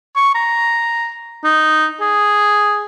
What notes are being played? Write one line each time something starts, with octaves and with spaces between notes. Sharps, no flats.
C#6
A#5
D#4
G#4